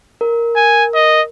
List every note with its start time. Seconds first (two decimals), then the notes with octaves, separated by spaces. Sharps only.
0.21 A#4
0.56 G#5
0.95 D#5